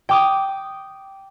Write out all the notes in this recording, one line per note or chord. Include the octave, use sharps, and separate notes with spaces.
G5 D6 D#6